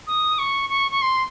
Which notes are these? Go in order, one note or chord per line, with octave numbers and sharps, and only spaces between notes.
D#6
C#6
C#6
C#6
C6